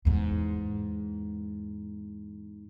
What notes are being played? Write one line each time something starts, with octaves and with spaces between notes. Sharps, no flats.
E2 G#2